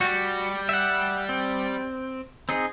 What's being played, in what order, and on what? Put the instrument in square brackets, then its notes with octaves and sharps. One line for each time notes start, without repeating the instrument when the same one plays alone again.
[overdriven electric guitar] G3 [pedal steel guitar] F#4
[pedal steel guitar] E5 F#5
C4
C4 D#4 G#4